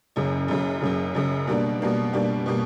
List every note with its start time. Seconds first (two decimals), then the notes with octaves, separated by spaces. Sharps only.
0.16 F#1 F#2 C#3
0.48 F#1 F#2 C#3
0.82 F#1 F#2 C#3
1.15 F#1 F#2 C#3
1.47 B2 G3 A#3 D4
1.80 B2 G3 A#3 D4
2.13 B2 G3 A#3 D4
2.46 B2 G3 A#3